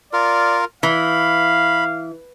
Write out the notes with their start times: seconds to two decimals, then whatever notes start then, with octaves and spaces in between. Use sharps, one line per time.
0.13 F4 A#4 D5
0.83 E3 F5 B5